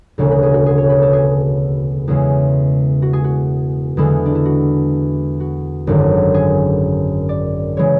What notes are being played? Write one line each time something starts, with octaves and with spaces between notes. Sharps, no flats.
E1 D2 C#3 C#5
B4
G#4
F#4
G#4
C#5
B4
A4
G#4
E2 C#3 G#3
F#4
G#4
F#4
E2 D3 G#3 E4
D4
E4
F#4
F#4
G#1 F#2 D3
G#4
D5
C#3 E3 G#3 C#5